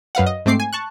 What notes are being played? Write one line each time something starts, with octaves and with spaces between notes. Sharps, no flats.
F#2 B4 F5 F#5
D#5
G#2 A3 C4 D6 C7
G#5
A5 C#6 F#6